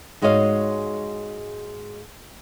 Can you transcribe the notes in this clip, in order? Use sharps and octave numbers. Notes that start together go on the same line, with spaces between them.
G#2 G#3 F#4 C#5 D#5 F5